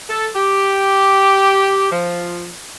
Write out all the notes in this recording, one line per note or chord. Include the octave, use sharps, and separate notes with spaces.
A4
G4
F3